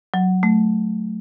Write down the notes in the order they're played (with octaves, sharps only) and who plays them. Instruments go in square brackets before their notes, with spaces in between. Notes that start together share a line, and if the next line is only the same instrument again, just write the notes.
[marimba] F#3
A3